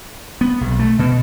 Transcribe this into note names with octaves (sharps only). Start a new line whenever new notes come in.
B3
B1
A3
B2